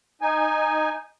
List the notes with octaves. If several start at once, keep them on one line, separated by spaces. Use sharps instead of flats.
D#4 G#5